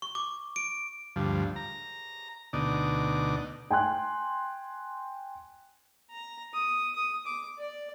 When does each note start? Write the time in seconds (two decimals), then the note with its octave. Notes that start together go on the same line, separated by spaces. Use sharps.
0.02 C#6
0.15 D6
0.56 D7
1.16 D2 G2 F3
1.56 A#5
2.53 D2 B2 D#4 D5
3.70 G5 G#5 C6 F#6
6.11 A#5
6.54 D#6
6.95 D#6
7.26 D6
7.59 D5